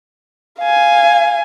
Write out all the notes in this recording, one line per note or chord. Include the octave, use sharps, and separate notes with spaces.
F5 G#5